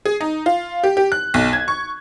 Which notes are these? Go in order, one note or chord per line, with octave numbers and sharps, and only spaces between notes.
G#4
D#4
F4
G4
G4
F#6
B1
G#6
C#6